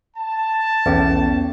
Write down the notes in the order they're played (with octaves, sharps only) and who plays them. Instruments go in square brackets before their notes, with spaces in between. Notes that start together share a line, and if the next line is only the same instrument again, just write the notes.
[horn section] A5
[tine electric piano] B1 E2 [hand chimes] B3 C#4 G5